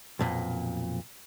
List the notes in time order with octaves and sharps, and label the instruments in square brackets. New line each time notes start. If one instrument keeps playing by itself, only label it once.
[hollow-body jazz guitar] B1 F2 A#2